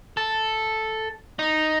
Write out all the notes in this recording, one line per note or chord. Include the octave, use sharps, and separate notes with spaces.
A4
D#4